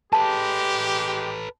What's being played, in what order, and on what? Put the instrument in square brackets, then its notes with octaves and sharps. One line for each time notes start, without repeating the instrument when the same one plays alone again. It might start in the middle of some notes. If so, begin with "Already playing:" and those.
[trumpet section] G#3 G4 [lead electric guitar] A4 B4 [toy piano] A5